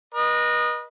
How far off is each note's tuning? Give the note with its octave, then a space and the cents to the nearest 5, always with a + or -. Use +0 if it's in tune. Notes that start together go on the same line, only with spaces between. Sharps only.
B4 -40 D#5 -15